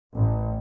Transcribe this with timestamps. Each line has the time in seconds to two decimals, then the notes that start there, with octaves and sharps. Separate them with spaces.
0.15 A1